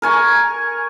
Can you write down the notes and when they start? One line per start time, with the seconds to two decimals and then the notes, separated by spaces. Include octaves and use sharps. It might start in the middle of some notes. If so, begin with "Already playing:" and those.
0.02 A#4 G#5 C#6